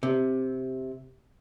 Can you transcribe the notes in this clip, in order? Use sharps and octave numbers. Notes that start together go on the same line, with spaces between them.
C3